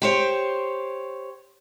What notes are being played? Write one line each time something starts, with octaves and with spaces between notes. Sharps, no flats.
G4 C5 C#5